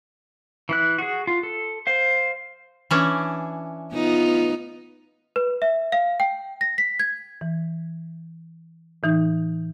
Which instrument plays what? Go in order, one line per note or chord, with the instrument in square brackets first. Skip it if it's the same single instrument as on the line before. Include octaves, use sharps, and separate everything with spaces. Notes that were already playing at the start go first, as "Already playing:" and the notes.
[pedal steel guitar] E3 E4 F#6
F#4 G#4
F4
A4
C5 F5
[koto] E3 C#4 D4
[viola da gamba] B3 D#4 F4
[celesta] B4
E5
F5
G5
A#6
B6
G#6
[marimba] E3
A2 E3 D#4 G6